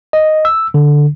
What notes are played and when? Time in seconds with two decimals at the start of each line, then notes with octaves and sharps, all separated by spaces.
0.13 D#5
0.45 E6
0.74 D3